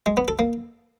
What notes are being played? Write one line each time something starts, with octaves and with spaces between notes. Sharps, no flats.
G#3
B3
A4
A#3